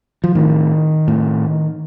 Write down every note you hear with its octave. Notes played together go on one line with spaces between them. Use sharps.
F3
A2 D#3
A2